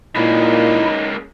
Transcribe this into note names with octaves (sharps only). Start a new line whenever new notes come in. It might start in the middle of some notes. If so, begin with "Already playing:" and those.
A#2 G#3 A#3 C#4 D#4 E4